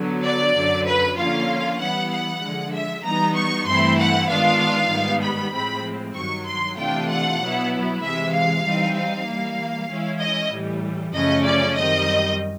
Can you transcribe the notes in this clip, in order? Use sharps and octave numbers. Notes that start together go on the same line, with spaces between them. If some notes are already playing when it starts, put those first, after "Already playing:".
Already playing: D3 F#3 B3
D5
F#2 D3 F#3
B4
D3 F3 A#3 C#4 F4 F5
E3 G3 B3 E4 F#5
F#5
D3 F3 G#3
E5
E3 G3 B3 D#4 A#5
C#6
G2 E3 A3 C4 E4 C6
F#5
D#3 G#3 B3 D4 F4 F5
G#2 D#3 G3 B3
B5
A2 F3 G#3 C4 B5
G2 D#3 F#3 C#6
C6
C3 E3 A3 D4 F4 G5
F#5
B2 F#3 B3 E4
C3 E3 G#3 E5
F5
E3 G3 C4 D#4
F5
E3 G3 A#3
E3 G#3 C#4 E4
D#5
A2 E3 G3
F#2 C#3 F3 A3 C#4 D#5
D5
F#2 D#3 G3 C4 D#5